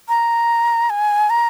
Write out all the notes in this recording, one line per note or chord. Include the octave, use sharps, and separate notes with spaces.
A#5
G#5
A#5